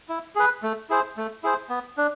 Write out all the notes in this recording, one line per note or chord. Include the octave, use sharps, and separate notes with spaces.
E4
G#4 B4
A3
E4 G#4 C5
A3
E4 G#4 C5
B3
D4